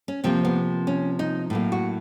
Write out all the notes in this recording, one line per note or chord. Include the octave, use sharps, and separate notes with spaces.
C#4
C3 F3 A#3 C4
B3
C#4
D#4
A2 F#3 A#3
F#4